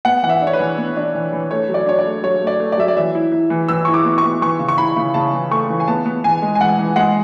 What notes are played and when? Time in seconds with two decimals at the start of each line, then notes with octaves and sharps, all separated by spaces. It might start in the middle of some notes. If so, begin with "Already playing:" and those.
0.05 B3 F#5
0.23 E3 F#5
0.29 E5
0.42 D4
0.47 C#5
0.53 B4
0.60 E3
0.78 B3
0.97 D4
1.14 E3
1.33 E3
1.51 A3 C#5
1.69 F#3
1.74 D5
1.86 D4 C#5
1.99 D5
2.05 A3
2.23 F#3 C#5
2.41 A3
2.47 D5
2.60 A3
2.72 D5
2.77 F#3 E5
2.88 D5
2.96 E3 E5
3.15 E4
3.32 E4
3.50 E3
3.69 E3 E6
3.85 E4 C#6
3.94 D6
4.05 B3
4.18 C#6
4.24 B3
4.42 E3 C#6
4.59 C#3
4.69 C#6
4.78 E4 B5
4.96 C#3
5.14 C#3 A5
5.33 E3
5.51 A3 C#6
5.69 E3
5.80 G#5
5.88 B3 A5
6.06 B3
6.24 E3 G#5
6.42 G#3
6.55 G#5
6.60 E3 F#5
6.79 E3
6.96 G#3 F#5